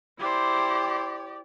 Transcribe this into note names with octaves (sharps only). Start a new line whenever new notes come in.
E4 G4 C5 D5